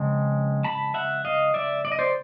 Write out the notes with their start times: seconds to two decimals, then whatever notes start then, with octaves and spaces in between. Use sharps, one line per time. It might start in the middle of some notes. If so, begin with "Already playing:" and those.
Already playing: C#3 F3 G#3 C4
0.64 A5 B5
0.94 E5 F#5
1.25 D#5 F5
1.54 D5 E5
1.85 D5
1.92 D#5
1.99 C5 D5